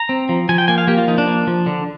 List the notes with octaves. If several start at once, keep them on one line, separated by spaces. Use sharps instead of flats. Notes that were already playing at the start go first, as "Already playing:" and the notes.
Already playing: A#5
C4
F3
F3 G#5
G5
A#3 G#5
F5
A#3 G4
F4
F3 D#4
D4
A#3
F3
D3